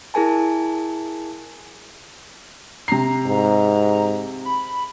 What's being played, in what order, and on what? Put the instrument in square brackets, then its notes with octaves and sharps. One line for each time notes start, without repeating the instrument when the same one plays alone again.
[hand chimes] E4 G#4 A#4 G#5 A5
[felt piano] C3 C7 [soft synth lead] A#5
[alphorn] G#2
[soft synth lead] B5